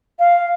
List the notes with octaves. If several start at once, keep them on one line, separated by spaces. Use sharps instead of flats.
F5